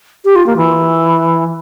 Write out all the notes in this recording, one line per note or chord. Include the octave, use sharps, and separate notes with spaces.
G4
F4
A#3
E3